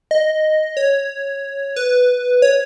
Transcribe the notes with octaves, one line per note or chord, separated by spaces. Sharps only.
D#5
C#5
B4
C#5